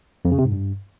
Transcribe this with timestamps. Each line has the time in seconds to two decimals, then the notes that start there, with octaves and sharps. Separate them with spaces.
0.25 F2
0.32 C#3
0.38 C3
0.45 G#2
0.52 G2